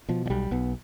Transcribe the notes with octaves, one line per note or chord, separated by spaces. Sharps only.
B2 F3
F3
B1 G3
B1 B3